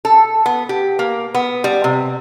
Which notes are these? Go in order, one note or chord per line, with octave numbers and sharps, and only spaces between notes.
A4
B3
G4
A#3
B3
G3
C3